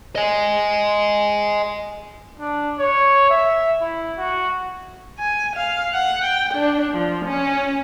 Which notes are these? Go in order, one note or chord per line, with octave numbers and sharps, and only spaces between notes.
D#5 G#5
D4
C#5
E5
E4
F#4
G#5
F5
F#5
G5
D4
F3
C#4